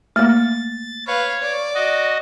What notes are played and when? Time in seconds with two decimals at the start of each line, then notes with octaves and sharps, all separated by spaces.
0.16 A3 A#3 A6
1.07 B4 C#5 F5
1.42 D5
1.75 F#4 D#5